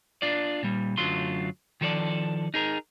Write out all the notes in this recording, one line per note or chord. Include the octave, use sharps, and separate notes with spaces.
D4 F4 D5
A#2 G3
F#2 D3 F#3 A3 F4 C6
D#3 F3 A4 C#5 D5
D#4 G#4 A#4